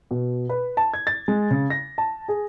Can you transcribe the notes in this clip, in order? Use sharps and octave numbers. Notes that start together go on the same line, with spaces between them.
B2
B4
A5
G#6
A6
G#3
C#3
A#6
A5
G#4